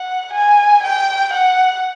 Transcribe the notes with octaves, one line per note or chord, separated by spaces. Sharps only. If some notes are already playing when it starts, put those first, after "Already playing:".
Already playing: F#5
G#5
G5
F#5